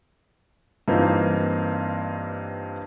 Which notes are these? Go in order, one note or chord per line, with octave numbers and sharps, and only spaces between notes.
G2 E3 A#3 C4 D#4 F4